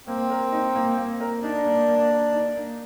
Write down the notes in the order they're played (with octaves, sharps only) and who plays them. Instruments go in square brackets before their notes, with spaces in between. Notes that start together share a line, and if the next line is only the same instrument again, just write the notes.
[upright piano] A#3 [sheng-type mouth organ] C4
[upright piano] A#4
D#4
A#3
A#3
A#4
[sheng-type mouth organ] D4 [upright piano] D#4
[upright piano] A#3
A#3
A#4
D#4
A#3